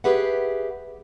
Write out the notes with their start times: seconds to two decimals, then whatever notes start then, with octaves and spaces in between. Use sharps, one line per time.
0.04 G4 G#4 B4 E5 F#5